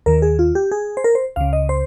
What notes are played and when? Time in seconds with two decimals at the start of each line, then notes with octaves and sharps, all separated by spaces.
0.06 D#2 D#3 A#4
0.22 G#4
0.39 F4
0.55 G4
0.72 G#4
0.97 C5
1.04 A#4
1.15 C5
1.36 C#2 C#3 F5
1.53 D#5
1.69 C5